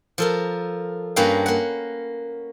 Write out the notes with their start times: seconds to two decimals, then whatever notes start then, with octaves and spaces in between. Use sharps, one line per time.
0.18 F3 A4 A#4
1.16 G2 A#3 C#4 B4 F5 G5
1.46 A#3 F#5